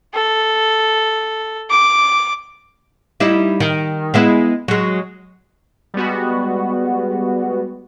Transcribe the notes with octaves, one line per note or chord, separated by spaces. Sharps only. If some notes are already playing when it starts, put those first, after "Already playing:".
A4
D6
G3 D#4 E4
D#3
G#3 B3 E4
F#3 G#3
G3 G#3 B3 F#4